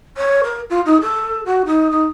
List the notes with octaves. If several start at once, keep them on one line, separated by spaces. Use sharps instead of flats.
C#5
A#4
F4
D#4
A4
F#4
D#4
D#4